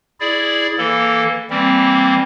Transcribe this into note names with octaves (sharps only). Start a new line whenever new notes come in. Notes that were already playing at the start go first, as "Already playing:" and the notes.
E4 G#4 D5
E3 A#3 A4
E3 G3 A#3 C4